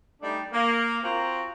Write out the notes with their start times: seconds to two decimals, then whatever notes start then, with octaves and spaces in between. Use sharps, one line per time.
0.22 G3 A3 D4 D#4
0.53 A#3
1.04 C4 F4 F#4 A#5